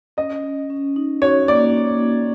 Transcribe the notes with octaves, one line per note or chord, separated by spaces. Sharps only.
C#4 D#5
C#4
C#4
D#4
F#4 C#5
A#3 D5